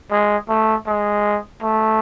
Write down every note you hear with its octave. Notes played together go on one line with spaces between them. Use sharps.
G#3
A3
G#3
A3